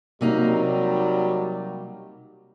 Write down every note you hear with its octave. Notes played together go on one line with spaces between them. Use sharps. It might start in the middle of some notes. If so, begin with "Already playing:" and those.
C3 F#3 G3 A#3 D#4